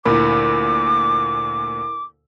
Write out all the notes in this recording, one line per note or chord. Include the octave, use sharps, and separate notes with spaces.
D2 A#2 E4 A#4 B5 D6